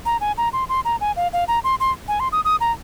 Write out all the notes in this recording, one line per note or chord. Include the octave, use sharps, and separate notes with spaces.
A#5
G#5
A#5
C6
C6
A#5
G#5
F5
F5
A#5
C6
C6
G#5
C6
D#6
D#6
A#5